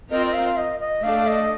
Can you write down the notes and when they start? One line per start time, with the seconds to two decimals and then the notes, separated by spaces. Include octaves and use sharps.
0.11 C4 F4 A#4 D#5
0.26 D#5
0.34 F5
0.57 D#5
0.80 D#5
1.03 A3 D4 A4 D5 F5
1.27 D#5